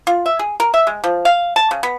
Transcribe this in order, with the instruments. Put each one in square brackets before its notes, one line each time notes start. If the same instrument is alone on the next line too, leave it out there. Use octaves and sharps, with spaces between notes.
[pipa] F4
E5
G#4
A#4
E5
G#3
F3
F5
A5
C#3
B3